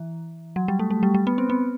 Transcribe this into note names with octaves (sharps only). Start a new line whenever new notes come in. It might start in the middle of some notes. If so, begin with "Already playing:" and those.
Already playing: E3
F#3
G3
A3
A3
G3
G3
B3
C4
B3